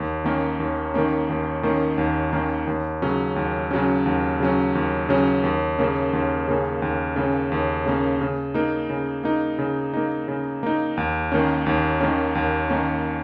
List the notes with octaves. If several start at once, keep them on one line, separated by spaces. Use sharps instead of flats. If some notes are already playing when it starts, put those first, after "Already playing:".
Already playing: D#2
D#3 A#3 C#4
D#2
D#3 A#3 C#4
D#2
D#3 A#3 C#4
D#2
D#3 A#3 C#4
D#2
C#3 F#3 C#4
D#2
C#3 F#3 C#4
D#2
C#3 F#3 C#4
D#2
C#3 F#3 C#4
D#2
C#3 A#3 C#4
D#2
C#3 A#3 C#4
D#2
C#3 A#3 C#4
D#2
C#3 A#3 C#4
C#3
A#3 D#4
C#3
A#3 D#4
C#3
A#3 D#4
C#3
A#3 D#4
D#2
D#3 A#3 C#4
D#2
D#3 A#3 C#4
D#2
D#3 A#3 C#4